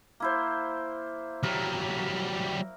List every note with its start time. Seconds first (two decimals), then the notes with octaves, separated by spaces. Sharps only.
0.20 A#3 E4 C5
1.43 F#3 G3 A#4